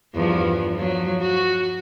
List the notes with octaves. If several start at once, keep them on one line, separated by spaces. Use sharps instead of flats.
E2 G2 F3
F3 F#3
F#4